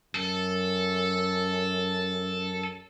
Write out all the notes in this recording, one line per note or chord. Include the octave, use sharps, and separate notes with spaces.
F#2 A4